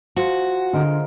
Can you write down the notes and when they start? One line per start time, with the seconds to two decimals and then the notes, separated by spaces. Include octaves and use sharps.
0.16 F3 F#4
0.73 D3 G#3 A#4 F5